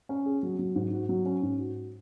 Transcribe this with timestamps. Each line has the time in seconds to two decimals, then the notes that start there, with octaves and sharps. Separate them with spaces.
0.09 C#4
0.26 G#4
0.43 F#3
0.59 F#3
0.75 G#2
0.93 F#4
1.09 F#3
1.26 C#4
1.42 G#2
1.59 F#4